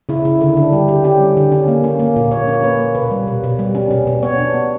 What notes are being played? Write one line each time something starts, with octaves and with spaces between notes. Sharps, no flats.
C#3 E4
C#3 E4
D3 E4
D3 D4
G3 G4
D3 G4
C#4 G4
G3
D3
C#4
A#3
C#4
A#3
A#2
A#3 C#5
C#4
C#5
A#3 B4
A#3
B2 B4
G3
B2
B2
G3
C#4
B2
B2
B3 C#5
D4
B3